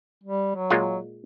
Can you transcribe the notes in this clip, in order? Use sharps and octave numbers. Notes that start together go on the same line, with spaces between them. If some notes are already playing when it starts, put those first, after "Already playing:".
G3
F#3
A#2 G#3 F4